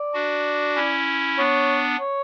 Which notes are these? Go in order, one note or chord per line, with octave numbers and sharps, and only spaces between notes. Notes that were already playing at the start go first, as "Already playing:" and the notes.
Already playing: D5
D4 F#4
C#4 E4
B3 D4 C#5
C#5